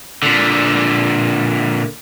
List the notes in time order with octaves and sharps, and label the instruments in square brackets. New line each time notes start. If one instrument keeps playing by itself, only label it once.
[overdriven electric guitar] A#2 D3